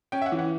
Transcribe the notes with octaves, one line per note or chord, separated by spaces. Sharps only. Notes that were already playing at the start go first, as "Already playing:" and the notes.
C#4 G5
E5
F#5
E3
F#5